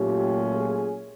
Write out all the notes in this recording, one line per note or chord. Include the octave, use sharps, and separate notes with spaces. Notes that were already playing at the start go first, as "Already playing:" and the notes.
Already playing: A#2 F#3 A3 C#4 F4 G4
G#4